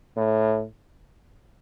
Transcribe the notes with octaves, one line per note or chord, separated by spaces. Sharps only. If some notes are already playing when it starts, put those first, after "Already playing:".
A2